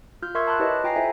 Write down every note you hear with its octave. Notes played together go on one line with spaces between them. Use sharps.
F4 F6 G6
A#4 E5 C6 C#6 E6 G#6
A5 B5 C6 D6 F#6
E4 G4 B4 C#5 D#5
F4 G5 G#5 A#5 A#6 C7
E4 A4 C5 E5 G#5